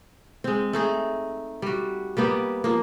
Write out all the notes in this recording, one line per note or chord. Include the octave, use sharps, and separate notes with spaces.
G#3 C4
A3 D#4 G#4
G3 F#4
G3 A#3 B3 G4
F3 A#3